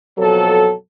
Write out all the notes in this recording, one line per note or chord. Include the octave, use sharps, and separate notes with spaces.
F2 B2 F#3 A4